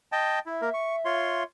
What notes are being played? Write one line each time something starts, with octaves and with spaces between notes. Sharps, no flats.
D#5 G5 A5
E4 E5
A#3 A#4
C#6
F4 C#5 C6